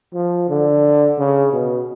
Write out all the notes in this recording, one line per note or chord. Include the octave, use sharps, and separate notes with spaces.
F3
D3
C#3
B2